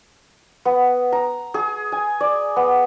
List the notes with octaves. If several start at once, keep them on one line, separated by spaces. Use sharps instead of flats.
B3
A#5
G#4
G#5
D5
B3